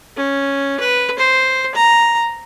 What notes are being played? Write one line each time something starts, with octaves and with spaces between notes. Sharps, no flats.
C#4
B4
C5
A#5